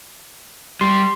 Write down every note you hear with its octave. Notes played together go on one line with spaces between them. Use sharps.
G3 C6